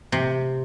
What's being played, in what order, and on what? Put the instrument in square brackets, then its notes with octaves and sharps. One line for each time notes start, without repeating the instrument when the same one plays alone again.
[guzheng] C3